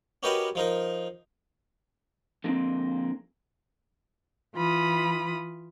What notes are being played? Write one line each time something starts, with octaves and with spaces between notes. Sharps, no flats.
C#4 F#4 G4 A#4 B4 D#5
F3 D#4 A#4
D3 F3 G#3 A#3 C4
E3 F4 B5 D#6